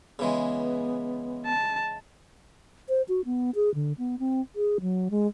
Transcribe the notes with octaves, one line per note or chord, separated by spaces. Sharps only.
C#3 E3 G#3 B3
A5
C5
F#4
B3
G#4
D3
B3
C4
G#4
F#3
G#3